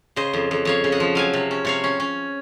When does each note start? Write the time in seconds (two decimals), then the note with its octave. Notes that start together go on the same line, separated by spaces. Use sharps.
0.16 C#3 C5 D#5
0.33 F2
0.51 F2
0.65 F2 C#5 F5
0.84 C#3
0.92 D#5 F#5
1.00 F3
1.15 F#3 F5 G#5
1.33 C3
1.51 C#4
1.65 C3 C#5 F5
1.84 C#4
2.00 C#4